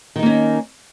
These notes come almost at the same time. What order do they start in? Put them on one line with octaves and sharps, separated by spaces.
D#3 D#4 A#3 C#4